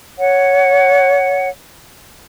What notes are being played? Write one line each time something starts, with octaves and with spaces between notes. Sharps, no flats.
C#5 F#5